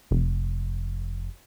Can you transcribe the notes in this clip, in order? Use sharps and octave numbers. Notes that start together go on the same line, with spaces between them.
F1